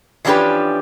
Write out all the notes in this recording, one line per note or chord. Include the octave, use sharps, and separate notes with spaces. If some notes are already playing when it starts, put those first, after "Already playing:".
E3 F3 C#4 D4 G4 B4